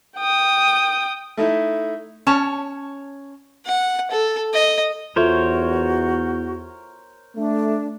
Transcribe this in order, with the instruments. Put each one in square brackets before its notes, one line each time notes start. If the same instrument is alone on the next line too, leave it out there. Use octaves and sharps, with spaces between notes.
[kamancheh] G5 D#6
[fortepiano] A3 D#4 E4
[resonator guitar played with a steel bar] C#4 A5 [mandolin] C#5
[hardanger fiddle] F#5
A4
D#5
[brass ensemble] E2 [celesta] F4 A4 E5 [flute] F#4 [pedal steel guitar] A#4 C5 C#5
[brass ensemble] A3 [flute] D4